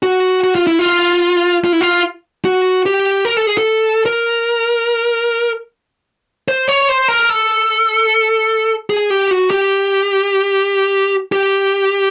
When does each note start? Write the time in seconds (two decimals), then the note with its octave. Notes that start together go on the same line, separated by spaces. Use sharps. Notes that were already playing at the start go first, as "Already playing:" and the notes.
0.03 F#4
0.44 F#4
0.55 F4
0.67 E4
0.79 F4
1.64 F4
1.73 E4
1.81 F4
2.45 F#4
2.86 G4
3.25 A#4
3.37 A4
3.47 G#4
3.58 A4
4.06 A#4
6.48 C5
6.68 C#5
6.89 C5
7.08 A#4
7.30 A4
8.90 G#4
9.10 G4
9.31 F#4
9.51 G4
11.32 G4